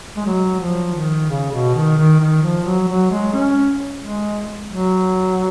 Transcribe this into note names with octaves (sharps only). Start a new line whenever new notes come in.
G#3
F#3
F3
D#3
C#3
B2
D#3
D#3
D#3
F3
F#3
F#3
G#3
C#4
G#3
F#3